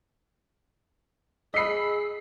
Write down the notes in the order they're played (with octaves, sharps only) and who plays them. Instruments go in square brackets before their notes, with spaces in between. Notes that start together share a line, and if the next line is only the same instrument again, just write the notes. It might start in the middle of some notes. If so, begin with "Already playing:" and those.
[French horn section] G#4 [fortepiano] D#5 B5 [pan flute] E6 [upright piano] B6 C7